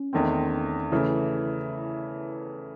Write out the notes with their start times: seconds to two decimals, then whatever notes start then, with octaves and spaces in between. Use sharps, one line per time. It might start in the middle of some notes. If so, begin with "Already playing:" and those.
Already playing: C#4
0.13 E2 D#3 A3 C4
0.92 C#3 E3 A3 E4